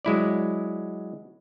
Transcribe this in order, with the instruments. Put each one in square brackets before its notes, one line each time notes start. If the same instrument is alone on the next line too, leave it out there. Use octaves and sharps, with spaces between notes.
[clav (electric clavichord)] F#3 G#3 E4 D5